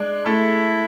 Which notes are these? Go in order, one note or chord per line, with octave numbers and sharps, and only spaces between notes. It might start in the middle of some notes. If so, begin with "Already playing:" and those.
Already playing: G#3 D4
A3 E4 A4